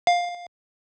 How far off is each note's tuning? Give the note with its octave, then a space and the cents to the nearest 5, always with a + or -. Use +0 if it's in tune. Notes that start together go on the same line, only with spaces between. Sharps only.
F5 +10